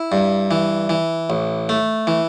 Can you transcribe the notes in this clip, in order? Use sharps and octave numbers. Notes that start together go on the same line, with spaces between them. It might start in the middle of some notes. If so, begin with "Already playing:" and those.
Already playing: E4
G2
E3
E3
A1
A3
E3